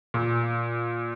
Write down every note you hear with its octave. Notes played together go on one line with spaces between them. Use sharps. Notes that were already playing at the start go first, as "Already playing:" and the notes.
A#2